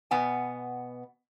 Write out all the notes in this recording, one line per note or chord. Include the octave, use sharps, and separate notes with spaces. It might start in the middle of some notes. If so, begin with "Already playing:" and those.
B2 B3 F#5 G#5